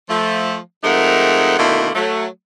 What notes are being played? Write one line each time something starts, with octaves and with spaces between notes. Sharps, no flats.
F3 A3
F2 G#2 A3 D#4 A#4 F#5
B2 D3 D#3 A3 A#3 E4
F#3 A3